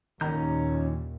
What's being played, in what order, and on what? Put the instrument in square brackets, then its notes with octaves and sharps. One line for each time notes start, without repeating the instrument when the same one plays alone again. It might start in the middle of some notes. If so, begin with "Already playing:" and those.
[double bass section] D#2 A#2 [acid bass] D#3 [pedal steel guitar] C#4 A#5 G6